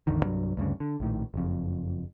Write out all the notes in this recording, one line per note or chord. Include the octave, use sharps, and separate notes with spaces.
A1 E2 D3 D#3
C2 G2 F#3
D2 G2 C#3
D3
A#1 A2 D#3
F#1 F2